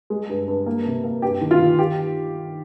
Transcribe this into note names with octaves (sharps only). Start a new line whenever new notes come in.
G#3
G2
G2
A#3
C3
A#3
G2 G4
D#3
F4
D#3
G4